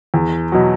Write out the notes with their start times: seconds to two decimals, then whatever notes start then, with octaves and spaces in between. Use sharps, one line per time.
0.14 E2
0.52 B2 F#3